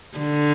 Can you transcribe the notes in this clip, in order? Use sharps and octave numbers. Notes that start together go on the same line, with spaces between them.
D3